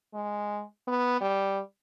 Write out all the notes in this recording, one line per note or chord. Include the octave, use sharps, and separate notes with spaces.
G#3
B3
G3